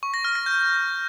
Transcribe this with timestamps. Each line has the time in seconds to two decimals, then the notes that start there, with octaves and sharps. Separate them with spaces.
0.03 C#6
0.14 A#6
0.25 F6
0.35 A#6
0.46 G6